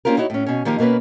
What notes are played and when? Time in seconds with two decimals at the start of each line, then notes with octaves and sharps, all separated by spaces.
0.05 A#3 C4 C#4 F4 G4 A#4
0.18 D#4 E4 F#4 C#5
0.30 A2 C#4
0.46 B2 C#4
0.65 D#3 F3 A#3 D#4 G4 A#4
0.78 B2 A#3 B3 C#4 B4